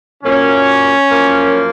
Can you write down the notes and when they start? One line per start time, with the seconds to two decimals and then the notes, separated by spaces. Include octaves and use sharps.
0.23 A#2 F#3 A#3 C#4
1.11 F#2 F3 A#3